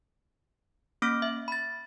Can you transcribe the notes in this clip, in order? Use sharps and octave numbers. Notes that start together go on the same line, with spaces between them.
A#3 C#4 D6 F6 A#6 D7
E5
B5 A6